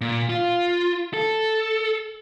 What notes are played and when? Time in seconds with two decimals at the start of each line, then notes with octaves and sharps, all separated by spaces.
0.01 A#2
0.29 F4
1.13 A4